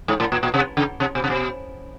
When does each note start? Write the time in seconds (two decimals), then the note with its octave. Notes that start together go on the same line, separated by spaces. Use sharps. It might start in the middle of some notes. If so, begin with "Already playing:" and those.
0.08 G#2
0.20 A2
0.32 A#2
0.43 A#2
0.54 C3
0.77 C#3
1.00 C3
1.15 B2
1.24 C3
1.30 B2